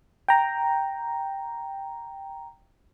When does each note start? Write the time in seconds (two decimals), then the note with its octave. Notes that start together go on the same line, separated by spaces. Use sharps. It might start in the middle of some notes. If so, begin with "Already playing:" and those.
0.28 G5 A#5